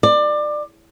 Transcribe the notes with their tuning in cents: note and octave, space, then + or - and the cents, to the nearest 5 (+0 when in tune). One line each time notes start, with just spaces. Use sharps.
D5 +25